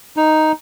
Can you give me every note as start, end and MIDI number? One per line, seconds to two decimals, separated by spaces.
0.17 0.52 63